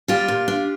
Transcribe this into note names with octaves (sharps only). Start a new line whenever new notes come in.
G3 F4 G4
A#2
D4